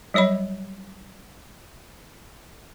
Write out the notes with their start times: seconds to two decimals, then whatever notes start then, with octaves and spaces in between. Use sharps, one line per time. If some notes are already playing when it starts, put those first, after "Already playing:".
0.14 F#3 G3 C#5 D#5 B5